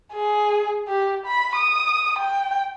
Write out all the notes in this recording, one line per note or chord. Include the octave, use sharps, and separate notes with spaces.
G#4
G4
B5
D#6
G5